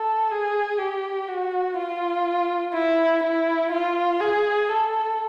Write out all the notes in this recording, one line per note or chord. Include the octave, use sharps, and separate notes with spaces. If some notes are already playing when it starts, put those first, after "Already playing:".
Already playing: A4
G#4
G4
F#4
F4
E4
E4
F4
G#4
A4